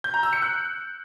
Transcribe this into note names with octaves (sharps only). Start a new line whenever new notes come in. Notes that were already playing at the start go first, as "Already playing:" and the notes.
G6
A#5
E6
C#7
F#6